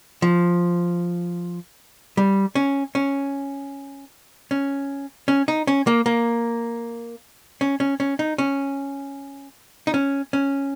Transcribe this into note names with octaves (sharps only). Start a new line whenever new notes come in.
F3
G3
C#4
C#4
C#4
C#4
D#4
C#4
A#3
A#3
C#4
C#4
C#4
D#4
C#4
D#4
C#4
C#4